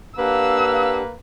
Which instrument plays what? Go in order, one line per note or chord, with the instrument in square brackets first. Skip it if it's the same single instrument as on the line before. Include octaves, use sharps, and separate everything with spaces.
[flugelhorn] A#3 [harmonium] D4 G4 F#5 [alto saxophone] B4 [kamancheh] F5 E6